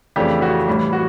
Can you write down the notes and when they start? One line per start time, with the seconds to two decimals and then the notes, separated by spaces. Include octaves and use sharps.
0.16 F2 C#3 E3 A3 D4 G4
0.42 F#4
0.67 A2 E3 G3
0.93 F#4